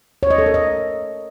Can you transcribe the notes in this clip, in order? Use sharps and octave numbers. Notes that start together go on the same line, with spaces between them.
C#5
D#5
A4
A#4
D#5